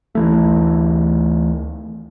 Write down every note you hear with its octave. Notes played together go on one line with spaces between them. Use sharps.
D2 E3 A3